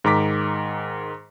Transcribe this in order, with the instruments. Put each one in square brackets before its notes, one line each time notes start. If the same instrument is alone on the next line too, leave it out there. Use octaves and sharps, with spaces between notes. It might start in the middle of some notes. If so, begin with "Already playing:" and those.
[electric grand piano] G#2 D#3 A#5 D6 B6